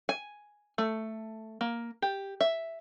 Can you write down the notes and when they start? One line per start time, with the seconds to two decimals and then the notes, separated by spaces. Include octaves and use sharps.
0.09 G#5
0.78 A3
1.61 A#3
2.02 G4
2.41 E5